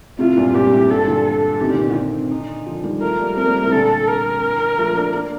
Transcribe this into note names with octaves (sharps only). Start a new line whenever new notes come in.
A2 C3 F4
G2 A#2
G2 A#2 G4
G2
A2
G2 A#2 A4
A#2 D3
A4
C3 D#3 G4
A#2 D3
C3 D#3
A#2 D3
C4
D#4
D3 F3
D#3 G3
F3 A3 A#4
G3 A#3
A3 C4 A#4
G3 A#3
A2 C3
A#2 D3 A4
A#4
F3 A3
A#3 D4
A#3 D4